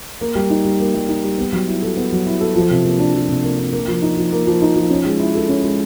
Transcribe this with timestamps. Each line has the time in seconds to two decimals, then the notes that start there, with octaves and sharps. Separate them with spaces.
0.21 A#3
0.35 G3
0.50 D#4
0.65 G3
0.80 A#3
0.94 G3
1.08 D#4
1.24 G3
1.38 B3
1.53 F#3
1.67 E4
1.82 A4
1.97 B3
2.12 F#3
2.26 E4
2.41 A4
2.55 F3
2.71 C3
2.84 A#3
2.99 D4
3.14 F3
3.28 C3
3.43 A#3
3.58 D4
3.72 A#3
3.88 F3
4.02 D#4
4.17 F3
4.32 A#3
4.47 F3
4.62 D#4
4.76 F3
4.90 C#4
5.06 G#3
5.20 E4
5.35 A4
5.49 C#4
5.64 G#3